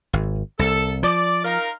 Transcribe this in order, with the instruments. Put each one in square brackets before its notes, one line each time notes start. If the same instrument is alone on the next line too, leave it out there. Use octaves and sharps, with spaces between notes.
[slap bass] G#1
[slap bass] C2 [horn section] A4
[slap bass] F3 [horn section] D5
[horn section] D#4 F4 A#4